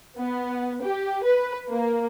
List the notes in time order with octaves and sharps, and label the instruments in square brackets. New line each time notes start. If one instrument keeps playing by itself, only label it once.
[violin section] B3
G4
B4
A#3